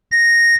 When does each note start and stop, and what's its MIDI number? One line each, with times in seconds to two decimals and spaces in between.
0.12 0.55 94